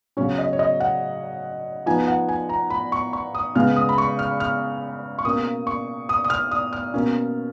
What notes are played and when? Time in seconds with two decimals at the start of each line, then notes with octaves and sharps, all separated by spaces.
0.17 C#3 F#3 C#4 C#5
0.38 D#5
0.53 C#5
0.59 D#5
0.80 F#5
1.86 F3 B3 D#4 G#5
2.08 F#5
2.29 G#5
2.49 A#5
2.70 B5
2.92 C#6
3.13 C#6
3.35 D#6
3.55 C#3 G#3 B3 F6
3.76 D#6
3.89 B5
3.98 C#6
4.19 F6
4.40 F6
5.19 C#6
5.25 B2 A#3 C#4 D#6
5.67 C#6
6.09 D#6
6.24 D#6
6.30 F6
6.51 D#6
6.73 F6
6.94 B2 A#3 C#4